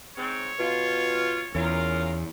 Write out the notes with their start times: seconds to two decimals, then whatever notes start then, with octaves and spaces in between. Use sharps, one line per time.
0.17 G#2 C4 C#5
0.59 B2 F4
1.55 E2 C#4 F4 A#4